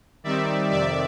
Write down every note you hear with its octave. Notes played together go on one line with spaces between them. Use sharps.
D#3 G3 C4 D#4 D5 E5
F2 C3 D#3 D5 E5